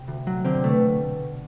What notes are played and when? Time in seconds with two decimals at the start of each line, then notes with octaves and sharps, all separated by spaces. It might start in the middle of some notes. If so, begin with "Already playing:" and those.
Already playing: C3
0.08 D2
0.27 F#3
0.45 D3 C4
0.54 C3
0.64 B2 A3